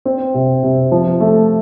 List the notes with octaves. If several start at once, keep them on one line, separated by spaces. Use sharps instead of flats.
C4
C3
C3
F3
A3